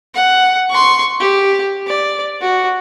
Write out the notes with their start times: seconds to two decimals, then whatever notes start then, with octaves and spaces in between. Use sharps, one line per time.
0.14 F#5
0.70 C6 C#6
1.20 G4
1.87 D5
2.41 F#4